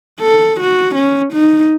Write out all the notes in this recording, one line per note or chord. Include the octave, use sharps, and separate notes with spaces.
A4
F#4
C#4
D#4